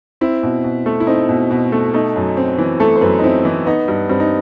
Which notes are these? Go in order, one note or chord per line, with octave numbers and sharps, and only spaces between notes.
C4 E4
B2
B2
A3
E4
C4 D#4
B2
B2
A3
A3 D#4
F#2
C4
E3
A3 A4
C5
F#2 B4
D#4
C4 E4
E3 C4
B3 D#4
G2
G2 C4
D#4